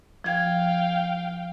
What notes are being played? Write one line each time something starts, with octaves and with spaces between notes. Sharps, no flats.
F3 F5 G5 G#6